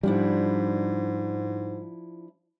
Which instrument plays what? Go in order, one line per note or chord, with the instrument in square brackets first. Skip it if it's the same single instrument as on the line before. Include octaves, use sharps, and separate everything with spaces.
[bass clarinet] G#2 [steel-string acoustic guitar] F3 D4 E4 [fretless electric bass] G3